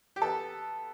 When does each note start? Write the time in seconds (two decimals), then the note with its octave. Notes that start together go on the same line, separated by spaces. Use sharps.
0.16 G4
0.22 B3 A4